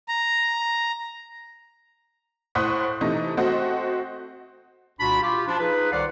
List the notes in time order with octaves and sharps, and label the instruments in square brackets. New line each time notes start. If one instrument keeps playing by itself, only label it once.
[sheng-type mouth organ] A#5
[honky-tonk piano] A2 C5 F#5 D#6 F#6 B6
C3 E3 A3 D#4
A3 C4 F#4 C5 D#5 F#5
[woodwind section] C2 A#2 D4 F#4 B5
F4 G4
F3 D4
D#4 F4 G#4 B4
C2 D#3 C5 D5 F5 F#5